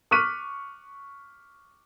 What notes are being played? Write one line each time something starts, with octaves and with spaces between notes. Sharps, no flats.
C#6 D6 F6 F#6 B6 D#7